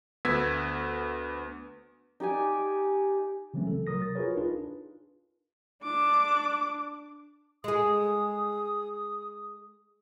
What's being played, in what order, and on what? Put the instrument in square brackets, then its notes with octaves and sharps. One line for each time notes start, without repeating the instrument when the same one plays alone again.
[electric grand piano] D2 B3 E6 G#6 B6
[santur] D#4 G4 D5 G#5
[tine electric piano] C#3 E3 F#3 A3 C4 C#4
A4
C3 F#3 A#4 D#6 A#6
A6
F4 F#4 G#4 A#4 B4 C#5
D4 D#4 F4 G#4 A#4 B4
[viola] D4 D6
[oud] G#3 G#4 [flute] D#6